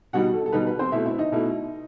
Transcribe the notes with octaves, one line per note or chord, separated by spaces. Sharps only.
B2 G3 D#4 F#4 F#5
A4
A4
B2 G3 D#4 B4
B4
C4 C5
B2 A3 E4 E5
E4 E5
D#4 D#5
B2 A3 E4